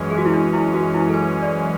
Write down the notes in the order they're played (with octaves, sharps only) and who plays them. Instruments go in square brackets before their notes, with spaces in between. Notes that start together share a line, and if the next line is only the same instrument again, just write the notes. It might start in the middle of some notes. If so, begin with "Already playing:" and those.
Already playing: [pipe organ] F#2 E3 G#3 C#4
[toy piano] G#4
F#4
E4
D4
E4
F#4
E4
A4
B4
D5